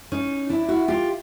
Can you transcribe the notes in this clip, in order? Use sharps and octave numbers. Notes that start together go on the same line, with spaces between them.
C#4 D#4
D4 E4
E4 F#4
F4 G4